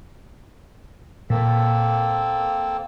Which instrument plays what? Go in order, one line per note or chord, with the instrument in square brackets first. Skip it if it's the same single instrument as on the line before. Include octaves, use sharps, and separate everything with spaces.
[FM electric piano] A#2 [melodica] A#3 C4 A4